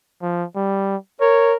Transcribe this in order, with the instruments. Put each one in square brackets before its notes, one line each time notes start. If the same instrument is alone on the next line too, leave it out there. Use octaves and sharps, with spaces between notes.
[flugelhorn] F3
G3
[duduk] A#4 [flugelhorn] C#5